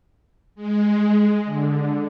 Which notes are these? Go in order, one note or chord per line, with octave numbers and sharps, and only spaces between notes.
G#3
D3